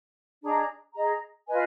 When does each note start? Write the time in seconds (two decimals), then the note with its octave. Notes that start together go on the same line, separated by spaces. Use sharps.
0.42 D4 G#4 D#5 A#5
0.95 G#4 D#5 A#5
1.47 F4 B4 D#5 G#5